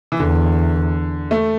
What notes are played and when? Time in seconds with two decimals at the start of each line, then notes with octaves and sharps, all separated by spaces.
0.12 E3
0.20 E2 D3
1.31 A3